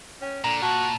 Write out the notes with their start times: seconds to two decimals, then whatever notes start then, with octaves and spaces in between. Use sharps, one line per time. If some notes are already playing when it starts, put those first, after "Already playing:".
0.22 C#4 G5
0.44 A#2 D3 A#5
0.62 F#4 A5